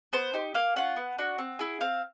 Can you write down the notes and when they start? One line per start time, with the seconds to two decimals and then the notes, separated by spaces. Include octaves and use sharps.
0.13 B3 C5
0.34 D#4 G4
0.54 A#3 F5
0.76 C#4 F4 F#5
0.96 B3
1.18 D4 F#4
1.38 C4
1.59 E4 G#4
1.81 C4 F5